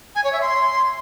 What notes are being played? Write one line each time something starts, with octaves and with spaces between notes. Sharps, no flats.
G#5
C#5
E5
C6